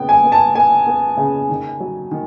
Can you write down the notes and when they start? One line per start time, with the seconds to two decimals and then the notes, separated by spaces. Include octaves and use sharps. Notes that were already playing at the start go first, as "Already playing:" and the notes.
Already playing: C#3 B3 G5
0.09 G#5
0.24 B3
0.32 A5
0.55 B3 G#5
0.87 B3
1.17 C#3
1.50 D#3
1.80 F#3
2.11 D#3